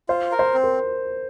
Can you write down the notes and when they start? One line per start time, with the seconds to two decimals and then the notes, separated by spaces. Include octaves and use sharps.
0.09 F4 C5
0.32 A#4
0.39 C5
0.54 C4
0.64 A#4